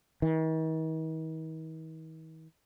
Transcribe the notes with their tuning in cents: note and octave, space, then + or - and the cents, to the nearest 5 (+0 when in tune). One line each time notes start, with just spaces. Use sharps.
D#3 +45